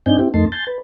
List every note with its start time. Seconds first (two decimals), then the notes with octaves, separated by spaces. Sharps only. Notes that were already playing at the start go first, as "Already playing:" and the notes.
0.06 G2 C4 D4 D#4 G#5 G6
0.19 C4 E4 G4
0.34 F2 A3 A#3 D#4 A5 C6
0.52 G#5 A5 C6 G6 A6
0.67 B4